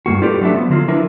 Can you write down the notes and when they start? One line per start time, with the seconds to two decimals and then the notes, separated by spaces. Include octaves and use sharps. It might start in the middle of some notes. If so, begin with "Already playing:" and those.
0.06 G2 A#2 A#3 F#4
0.22 D#4 F4 G4 A4 B4 D5
0.41 F#3 A3 D4 F#4 B4 E5
0.54 F3 B3
0.70 D3 F#3 F4
0.88 F3 D4 E4 A#4 B4 E5